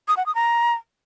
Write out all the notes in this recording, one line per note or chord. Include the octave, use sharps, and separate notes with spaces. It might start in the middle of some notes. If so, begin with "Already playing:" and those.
D#6
F#5
D#6
A#5